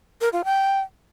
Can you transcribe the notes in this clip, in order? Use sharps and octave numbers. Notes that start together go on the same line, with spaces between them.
A#4
F4
G5